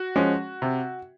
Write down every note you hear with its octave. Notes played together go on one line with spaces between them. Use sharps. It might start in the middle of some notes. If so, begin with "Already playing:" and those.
Already playing: F#4
F3 G#3 C#4
C3